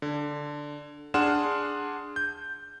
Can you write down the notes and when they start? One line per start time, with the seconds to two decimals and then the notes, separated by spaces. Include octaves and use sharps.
0.02 D3
1.14 D4 G#4 F#5 C6 F6 E7
2.16 G6